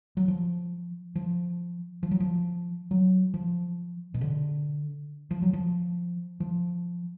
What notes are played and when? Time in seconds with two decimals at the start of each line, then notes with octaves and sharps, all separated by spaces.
0.17 F#3
0.28 F3
1.16 F3
2.03 F3
2.11 F#3
2.20 F3
2.91 F#3
3.34 F3
4.14 B2
4.21 D3
5.31 F3
5.42 F#3
5.53 F3
6.40 F3